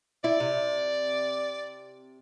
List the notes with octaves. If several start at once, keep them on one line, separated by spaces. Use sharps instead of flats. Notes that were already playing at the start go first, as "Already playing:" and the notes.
E4 D5
C3